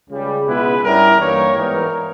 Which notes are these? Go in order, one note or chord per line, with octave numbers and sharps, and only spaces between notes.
C#2 C#3 G3
C#2 B2 G#3 B3 E4 B4
G2 G3 C#4 E4 A#4
G2 E3 G3 A#3 D#4 C#5
G#2 E3 G3 B3 D#4 A#4